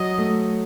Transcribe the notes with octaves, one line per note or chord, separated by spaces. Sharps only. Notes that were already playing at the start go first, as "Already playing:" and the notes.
Already playing: F#3 D#5
A3